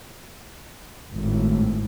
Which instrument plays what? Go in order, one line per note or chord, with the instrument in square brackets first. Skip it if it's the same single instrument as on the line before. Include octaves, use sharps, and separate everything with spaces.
[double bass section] G#1 A2